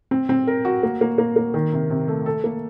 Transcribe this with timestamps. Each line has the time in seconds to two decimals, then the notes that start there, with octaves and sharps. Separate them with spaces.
0.11 C4
0.29 C4
0.47 A#4
0.65 F#4
0.83 A#3
1.01 A#3
1.18 A#3
1.36 A#3
1.54 D#3
1.73 C3
1.90 C3
2.08 A3
2.26 A4
2.44 A#3